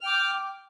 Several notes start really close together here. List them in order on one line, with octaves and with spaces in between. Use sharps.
F6 G5 D6